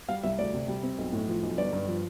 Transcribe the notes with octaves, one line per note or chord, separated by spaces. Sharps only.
G3 F5
C2 E5
D2 D5
C3
G3
C4
B1
A2
F3
B1
G1 D5
G2
F3